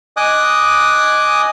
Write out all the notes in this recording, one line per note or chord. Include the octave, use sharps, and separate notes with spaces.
D#5 G#5 D6 D#6 F#6